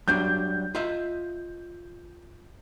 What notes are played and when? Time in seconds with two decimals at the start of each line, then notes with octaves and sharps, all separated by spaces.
0.08 F#3 G3 D4 G6
0.75 F4 D#5 E5